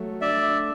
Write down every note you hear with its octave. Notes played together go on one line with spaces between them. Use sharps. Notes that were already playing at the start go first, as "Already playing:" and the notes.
Already playing: F#3 A3
D4 D5 E5